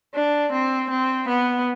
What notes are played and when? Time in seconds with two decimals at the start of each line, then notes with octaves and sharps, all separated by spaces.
0.14 D4
0.52 C4
0.90 C4
1.28 B3